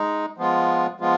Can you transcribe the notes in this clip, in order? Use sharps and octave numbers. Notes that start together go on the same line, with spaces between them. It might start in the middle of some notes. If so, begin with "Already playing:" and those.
Already playing: G#3 D#4
F3 G#3 B3 F4
F3 G#3 B3 F4